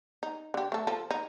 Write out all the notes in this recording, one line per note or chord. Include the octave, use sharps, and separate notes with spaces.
D#4
D3 G4
A3 A4
F3 A4
D#4